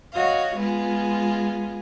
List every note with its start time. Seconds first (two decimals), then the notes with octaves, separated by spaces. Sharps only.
0.12 F#4 C#5 D#5 F5
0.56 G#3 B3 F4 G#4